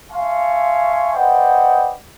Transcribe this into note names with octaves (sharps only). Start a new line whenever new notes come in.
E5 F5 G#5 A5 C6 C#6
B4 C5 D5 D#5 F#5 G5